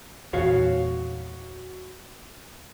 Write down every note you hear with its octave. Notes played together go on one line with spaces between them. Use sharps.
E2 A#2 F#4 C#5 F5